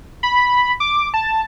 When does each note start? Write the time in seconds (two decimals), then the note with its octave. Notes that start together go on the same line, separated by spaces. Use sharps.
0.23 B5
0.80 D6
1.14 A5